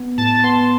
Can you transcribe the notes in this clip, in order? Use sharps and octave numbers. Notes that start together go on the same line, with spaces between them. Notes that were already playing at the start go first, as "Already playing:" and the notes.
Already playing: B3
A2 A5
B3 C6